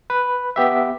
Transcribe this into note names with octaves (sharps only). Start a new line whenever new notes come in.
B4
B3 G4 E5